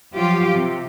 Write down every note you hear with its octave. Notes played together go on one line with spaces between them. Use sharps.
F3 F#3 F4 G4
C3